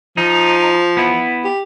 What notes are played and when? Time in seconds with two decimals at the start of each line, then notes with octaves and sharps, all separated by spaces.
0.17 F3 D#4
0.97 B3 E4
1.44 G4